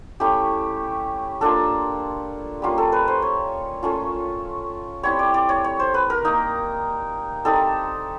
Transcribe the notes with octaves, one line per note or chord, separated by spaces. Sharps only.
A3 C#4 E4 G4
A#3 D4 F4 A4
G3 A#3 C#4 F4
A4
B4
C5
C#5
A3 C#4 F4
G3 C4 E4 C#5
D5
D5
C#5
C#5
C5
B4
A#4
A#3 D#4
G3 C4 D#4 A4